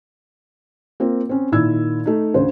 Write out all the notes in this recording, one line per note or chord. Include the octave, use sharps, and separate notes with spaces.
A#3 C4 F4
C4 C#4
A#2 D#3 E4 E6 G#6
A3 D#4
D2 C#3 C5